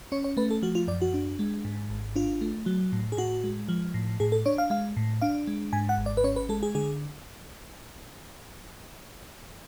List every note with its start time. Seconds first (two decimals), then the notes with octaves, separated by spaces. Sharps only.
0.12 C#4 C#5
0.24 C#5
0.37 A3 B4
0.51 A4
0.62 F3 F#4
0.75 F4
0.88 F#2 D5
1.02 F#4
1.14 D4
1.39 G#3
1.65 G#2
1.90 G#1
2.16 D4 F4
2.41 A3
2.66 F#3
2.92 A2
3.12 G#4
3.17 A2 F#4
3.44 G#3
3.69 F3
3.94 A2
4.20 A2 G#4
4.32 A4
4.46 D4 C#5
4.58 F5
4.70 G#3 F5
4.97 A2
5.22 D4 F5
5.47 G#3
5.73 G#2 G#5
5.89 F#5
5.98 G#1
6.06 D5
6.17 B4
6.24 C#4 C#5
6.36 B4
6.49 G#3 A4
6.63 G#4
6.75 D3 G#4